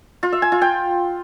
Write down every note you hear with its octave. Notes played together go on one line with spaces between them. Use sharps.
F4
E5
G#5
F4
G5